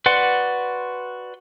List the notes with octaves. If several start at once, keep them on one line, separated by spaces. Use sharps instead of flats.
F#4 B4 D5 F#5 C6